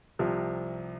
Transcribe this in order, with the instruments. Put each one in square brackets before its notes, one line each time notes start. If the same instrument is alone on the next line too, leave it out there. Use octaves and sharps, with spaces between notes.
[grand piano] C2 C3 F3